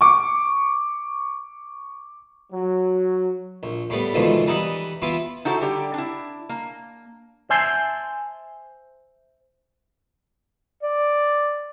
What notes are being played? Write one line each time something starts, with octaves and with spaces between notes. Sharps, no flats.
C#6 D6
F#3
A#1
A2 G3 B3
D#2 G#2 B2 D3 E3 F3
E3 G3 D#4 E4 D#5 F#5
E3 B3 E4 F4
D#4 E4 F#4 A4 C5
D3 G3 G4
D4 E4
A#3
C5 E5 G#5 A5 C6
D5